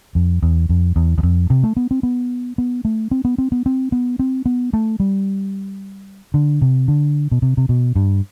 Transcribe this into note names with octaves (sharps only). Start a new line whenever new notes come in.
F2
E2
F2
E2
E2
F2
C3
A3
B3
C4
B3
B3
A3
C4
B3
C4
B3
C4
B3
C4
B3
A3
G3
D3
C3
D3
B2
C3
C3
B2
G2